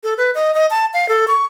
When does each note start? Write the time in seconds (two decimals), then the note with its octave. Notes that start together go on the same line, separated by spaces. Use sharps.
0.04 A4
0.18 B4
0.35 D#5
0.55 D#5
0.70 A5
0.94 F5
1.09 A4
1.28 C#6